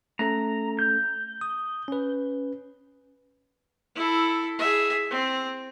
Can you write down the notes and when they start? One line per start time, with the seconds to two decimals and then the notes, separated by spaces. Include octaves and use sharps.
0.19 A3 C#4 A4 A#5
0.79 G6
1.41 D#6
1.88 C#4 B4
3.95 E4 A4
4.59 G#4 E5
5.11 C4